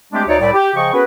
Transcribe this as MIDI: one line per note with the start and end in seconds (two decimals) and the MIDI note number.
0.13 0.23 56
0.13 0.23 57
0.13 0.23 60
0.13 0.23 62
0.13 0.23 67
0.28 0.36 38
0.28 0.36 63
0.28 0.36 73
0.28 0.36 74
0.41 0.53 36
0.41 0.53 45
0.41 0.53 64
0.41 0.53 74
0.54 0.72 67
0.75 0.90 49
0.75 0.90 53
0.75 0.90 75
0.75 0.90 79
0.75 0.90 85
0.93 1.04 59
0.93 1.04 61
0.93 1.04 66
0.93 1.04 68
0.93 1.04 70
0.93 1.04 71